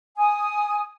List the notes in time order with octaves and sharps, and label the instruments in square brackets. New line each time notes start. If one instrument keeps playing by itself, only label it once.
[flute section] G#5 D#6